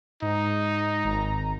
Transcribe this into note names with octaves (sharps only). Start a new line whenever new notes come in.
G#2 D#4
G#1 A#5